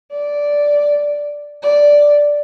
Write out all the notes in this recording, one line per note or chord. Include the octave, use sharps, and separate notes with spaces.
D5
D5